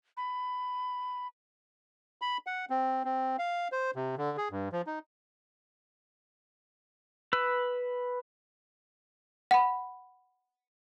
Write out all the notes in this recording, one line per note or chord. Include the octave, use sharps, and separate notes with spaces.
B5
B5
F#5
C4
C4
F5
C5
C3
D3
G#4
G2
F3
D#4
B4 E6
F#5 B5